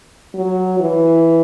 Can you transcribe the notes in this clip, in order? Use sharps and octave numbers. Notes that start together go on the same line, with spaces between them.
F#3
E3